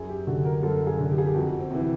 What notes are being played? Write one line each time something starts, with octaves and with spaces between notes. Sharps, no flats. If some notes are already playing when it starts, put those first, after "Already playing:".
Already playing: F#2 G#4
G4
D3 F#4
A#4
F#2 A4
G#4
D3
G4
G#4
G4
F2 F#4
C4
C3 E3